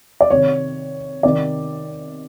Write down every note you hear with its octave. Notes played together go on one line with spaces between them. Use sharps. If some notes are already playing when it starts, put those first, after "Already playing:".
D5
C3 D#3 C#5
C3 D#3 D5